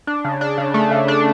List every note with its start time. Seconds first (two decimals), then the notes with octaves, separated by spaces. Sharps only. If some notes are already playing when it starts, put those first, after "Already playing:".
0.07 D4
0.24 C#3
0.41 D4
0.58 C#3
0.74 A3
0.91 C#3
1.08 D4